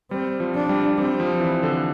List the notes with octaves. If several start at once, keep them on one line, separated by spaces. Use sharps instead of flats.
G3 C4
F3
D4
G3
G3 C4
F3
E3
D3